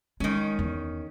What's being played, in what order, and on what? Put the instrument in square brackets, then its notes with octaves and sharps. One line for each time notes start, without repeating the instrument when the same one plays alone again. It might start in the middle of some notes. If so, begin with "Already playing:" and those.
[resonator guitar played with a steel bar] D#3 C#4 [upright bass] G#3
[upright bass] E2